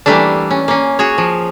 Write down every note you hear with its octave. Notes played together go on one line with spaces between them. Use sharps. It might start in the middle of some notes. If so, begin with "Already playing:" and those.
E3 G3 A3 A#3 D4
C#4
A#3 C#4
F#4 G#4 C#5
F3